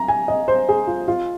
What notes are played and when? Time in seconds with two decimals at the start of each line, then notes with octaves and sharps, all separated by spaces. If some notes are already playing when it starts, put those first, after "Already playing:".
Already playing: A#5
0.08 G#5
0.28 D#5
0.48 C5
0.69 G#4
0.87 F4
1.08 F4